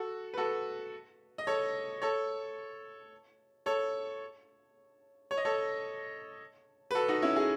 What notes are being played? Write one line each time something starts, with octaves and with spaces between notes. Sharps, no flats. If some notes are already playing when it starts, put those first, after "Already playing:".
Already playing: F#4 A4
B4
F#4 A4
D#5
A4 C#5
A4 C#5
A4 C#5
C#5
D#5
A4 C#5
B4
F#4 A4
D#4 F#4
C#4 E4
E4 G#4